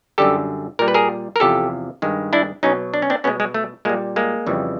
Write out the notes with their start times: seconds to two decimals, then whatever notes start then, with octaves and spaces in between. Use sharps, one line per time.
0.18 F#2 D3 G3 G4 A4
0.79 A#2 G3 A#4
0.88 B4
0.94 G#4 A#4
1.36 A#4
1.40 E2 C3 F3 G4 A4
2.02 G2 D#3 G#3
2.33 D4 E4
2.63 B2 F#3 C#4 D#4
2.94 D4
3.02 C#4
3.10 C4 D4
3.24 B2 G#3 B3 C#4
3.40 G#3
3.54 A3
3.85 A#2 G3 G#3 A#3
4.16 G#3 A#3
4.47 F2 C#3 E3 G3